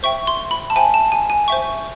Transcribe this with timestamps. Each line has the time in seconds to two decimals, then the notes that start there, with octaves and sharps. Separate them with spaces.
0.03 C5 E5 G5 C#6
0.27 C6
0.51 B5
0.70 A5
0.76 C5 E5 G5 G#5
0.94 A5
1.12 G#5
1.30 G#5
1.48 C5 E5 G5 C#6